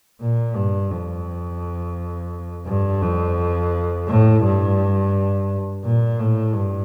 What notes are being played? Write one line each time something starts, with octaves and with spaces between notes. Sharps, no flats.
A#2
G2
F2
G2
F2
A2
G2
A#2
A2
G2